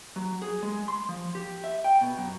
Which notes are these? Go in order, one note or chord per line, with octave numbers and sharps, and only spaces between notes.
F#3
G#4
G#3
C6
F3
G4
E5
G5
B2
F#2